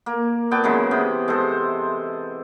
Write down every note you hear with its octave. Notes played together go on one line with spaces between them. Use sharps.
A#3
A#2 B3 G5 A5
C#3 E3 F#3 G#3
C3 B3 G5
G#3 A4 C5